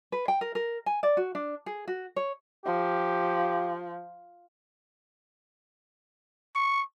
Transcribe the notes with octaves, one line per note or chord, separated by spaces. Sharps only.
B4
G5
A#4
A#4
G#5
D5
F#4
D4
G#4
F#4
C#5
F3 G4
C#6